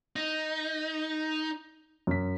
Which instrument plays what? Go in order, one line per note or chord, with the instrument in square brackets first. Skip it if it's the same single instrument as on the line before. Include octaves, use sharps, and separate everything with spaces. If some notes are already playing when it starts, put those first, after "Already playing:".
[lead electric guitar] D#4
[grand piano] F#2 B6